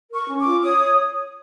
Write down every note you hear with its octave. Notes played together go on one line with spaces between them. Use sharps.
A#4
C#6
C#4
D6
F4
C#5 D#6